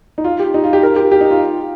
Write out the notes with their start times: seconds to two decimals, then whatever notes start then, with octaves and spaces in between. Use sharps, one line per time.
0.18 D#4
0.24 F4
0.39 G4
0.54 D#4
0.64 F4
0.73 G4
0.83 A#4
0.96 G4
1.12 G4
1.21 D#4
1.31 F4